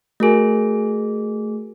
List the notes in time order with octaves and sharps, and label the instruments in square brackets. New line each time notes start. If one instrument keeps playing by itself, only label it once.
[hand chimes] A3 G#4 [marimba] F#4 A#4 G#5